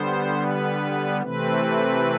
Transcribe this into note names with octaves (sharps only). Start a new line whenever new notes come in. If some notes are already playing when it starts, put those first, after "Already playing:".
Already playing: D3 G3 B3 C5
B4
C3 E3 A3 C4 B4